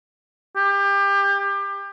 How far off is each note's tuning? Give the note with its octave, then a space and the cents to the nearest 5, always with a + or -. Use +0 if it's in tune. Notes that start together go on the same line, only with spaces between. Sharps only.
G4 +25